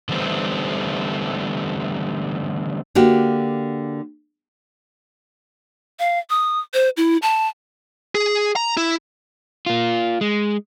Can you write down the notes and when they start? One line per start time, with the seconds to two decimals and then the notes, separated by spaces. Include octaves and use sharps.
0.09 D3 E3 G3 A3 B3 C4
2.95 D3 A#3 F#4 G4
5.99 F5
6.30 D#6
6.74 C5
6.97 E4
7.22 A5
8.15 G#4
8.56 A#5
8.77 E4
9.66 A#3 F4
10.21 G#3